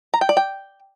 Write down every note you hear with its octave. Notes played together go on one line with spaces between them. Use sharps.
A#5
G5
D5
G5